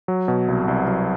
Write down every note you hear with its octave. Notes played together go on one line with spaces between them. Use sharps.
F#3
B2
C2
C2
F#3